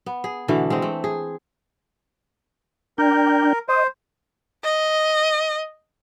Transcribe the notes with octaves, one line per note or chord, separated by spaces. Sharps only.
B3
G#4
B2 D3 E3 A3
G#3 C4
A3
G#4
D4 A#4 G5
C5 D#5
D#5